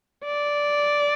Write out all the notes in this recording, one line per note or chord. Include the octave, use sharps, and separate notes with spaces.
D5